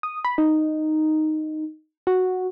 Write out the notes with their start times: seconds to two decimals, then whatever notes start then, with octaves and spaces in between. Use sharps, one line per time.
0.03 D#6
0.25 B5
0.38 D#4
2.07 F#4